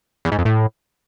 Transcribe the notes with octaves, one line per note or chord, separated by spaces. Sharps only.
E2
G#2
F2
A2